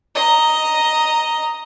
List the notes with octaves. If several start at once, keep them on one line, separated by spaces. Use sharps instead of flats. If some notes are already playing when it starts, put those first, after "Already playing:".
D#5 A#5